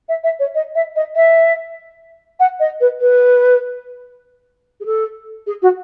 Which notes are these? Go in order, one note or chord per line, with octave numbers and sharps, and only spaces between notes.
E5
E5
C#5
D#5
E5
D#5
E5
F#5
D#5
B4
B4
G#4
A4
G#4
F#4